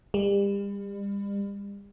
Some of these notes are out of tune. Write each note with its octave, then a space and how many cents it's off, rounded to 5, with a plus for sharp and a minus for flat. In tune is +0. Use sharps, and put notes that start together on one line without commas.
G3 +40